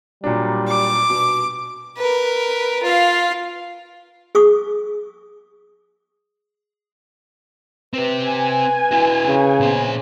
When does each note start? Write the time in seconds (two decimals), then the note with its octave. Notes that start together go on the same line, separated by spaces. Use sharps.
0.24 A#2 F#3 G3 D4
0.69 D6
1.10 B2
1.98 A#4 B4
2.83 F4 F5
4.35 G#4 C#6 D#6
7.93 C4 G4 B4
8.25 G#5
8.91 E4 F#4
9.26 C#3
9.60 A#2 B3 C5